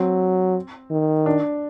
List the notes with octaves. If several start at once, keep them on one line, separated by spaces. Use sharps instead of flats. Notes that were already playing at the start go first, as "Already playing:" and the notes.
Already playing: F#3 C4
D#3
D4